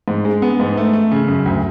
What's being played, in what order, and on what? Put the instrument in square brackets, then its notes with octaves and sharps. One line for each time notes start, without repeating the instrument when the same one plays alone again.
[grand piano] G#2
G#3
B3
G#2
A3
A3
C#3
F#2
D2